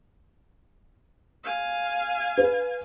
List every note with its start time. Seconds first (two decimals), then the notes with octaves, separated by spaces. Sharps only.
1.44 F5 G#5
2.38 B4